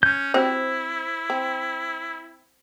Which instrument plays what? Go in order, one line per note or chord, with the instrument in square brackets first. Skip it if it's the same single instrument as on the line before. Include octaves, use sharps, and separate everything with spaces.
[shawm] C#4 [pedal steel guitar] G6
[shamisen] C4 F#4 G4 [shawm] E4 [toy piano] C5
[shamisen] C4